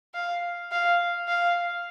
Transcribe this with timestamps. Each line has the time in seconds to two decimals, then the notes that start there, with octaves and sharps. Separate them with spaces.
0.14 F5
0.72 F5
1.28 F5